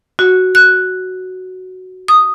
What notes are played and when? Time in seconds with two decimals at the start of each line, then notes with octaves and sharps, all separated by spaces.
0.19 F#4
0.55 F#6
2.08 D#6